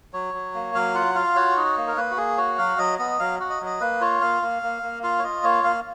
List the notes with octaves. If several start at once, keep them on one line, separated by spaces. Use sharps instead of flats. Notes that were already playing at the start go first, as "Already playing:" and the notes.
F#3 C#5
F#3
A#3
F#3 F5
F4 F#5
F4 F5
F#4 C#5
D#4
A#3
A#4
A#3 B4
F#4
A#3 G#4
F#4 C#5
F#3 F5
F#3 D#5
B3 D#5
F#3 F5
F#4
D#5
F#3
D#5
A#3 B4
F4 C#5
A#3 F5
A#3
A#3
A#3
F4 F5
C#5
F4 D#5
A#3 C#5
A#3 F5